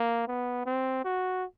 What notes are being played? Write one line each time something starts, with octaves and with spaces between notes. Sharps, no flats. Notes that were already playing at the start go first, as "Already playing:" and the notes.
Already playing: A#3
B3
C4
F#4